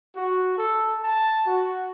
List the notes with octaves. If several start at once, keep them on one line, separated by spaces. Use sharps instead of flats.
F#4
A4
A5
F#4